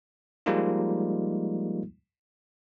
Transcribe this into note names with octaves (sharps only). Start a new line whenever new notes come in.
F3 G3 G#3 A#3 D#4 F4